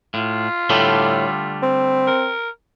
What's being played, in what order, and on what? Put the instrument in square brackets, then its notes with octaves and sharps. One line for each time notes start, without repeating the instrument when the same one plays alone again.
[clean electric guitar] A2 [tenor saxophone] F4
[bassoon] A2 [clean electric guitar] D3 G3 A3
[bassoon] C4
[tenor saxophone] A#4